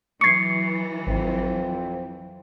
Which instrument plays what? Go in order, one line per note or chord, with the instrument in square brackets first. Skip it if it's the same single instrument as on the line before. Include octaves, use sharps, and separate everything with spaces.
[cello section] E3 F#3 [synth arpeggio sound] C#6 G#6 [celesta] C7 C#7
[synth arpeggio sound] G#1 [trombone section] F2 F3 C4